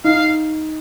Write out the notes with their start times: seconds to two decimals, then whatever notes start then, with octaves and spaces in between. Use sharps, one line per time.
0.04 D#4 F5
0.16 F5